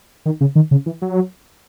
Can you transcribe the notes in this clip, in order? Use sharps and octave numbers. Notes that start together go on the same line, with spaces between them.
D#3
C#3
D#3
C#3
E3
F#3